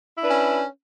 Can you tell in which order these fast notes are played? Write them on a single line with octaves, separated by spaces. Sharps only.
E4 D4 B4 C#4